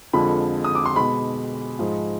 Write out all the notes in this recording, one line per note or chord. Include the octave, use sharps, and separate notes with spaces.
F2 D3 F3 G#3 B5
D#6
D6
C6
B2 G#3 B5
G#2 F3 G#3